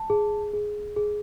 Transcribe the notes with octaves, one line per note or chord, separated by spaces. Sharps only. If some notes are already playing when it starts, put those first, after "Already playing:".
Already playing: A5
G#4
G#4
G#4